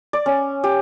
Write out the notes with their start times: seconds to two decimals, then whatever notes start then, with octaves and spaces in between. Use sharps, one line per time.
0.13 D5
0.26 C#4
0.64 G4